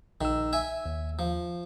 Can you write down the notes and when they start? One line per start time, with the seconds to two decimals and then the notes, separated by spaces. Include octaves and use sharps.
0.21 A#1 D#3 E6
0.53 E5 G#5
0.86 D#2
1.19 F3